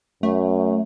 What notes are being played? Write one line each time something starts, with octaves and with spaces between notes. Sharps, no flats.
F#2 A3